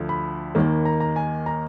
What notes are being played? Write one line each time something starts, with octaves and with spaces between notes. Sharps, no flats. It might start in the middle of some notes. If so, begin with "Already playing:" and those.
Already playing: D2 D3 F3
B5
D#2 D#3 A#3
A#5
A#5
G#5
A#5